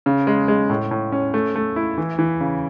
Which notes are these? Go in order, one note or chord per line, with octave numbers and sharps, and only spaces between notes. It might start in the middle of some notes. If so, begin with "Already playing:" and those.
C#3
G#3
G#3
A2
A2
C#4
A3
A3
E4
E3
E3
C#3